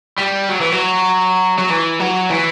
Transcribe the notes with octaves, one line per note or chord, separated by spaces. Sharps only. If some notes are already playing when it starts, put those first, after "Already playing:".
G3
F#3
E3
F#3
F#3
E3
F#3
E3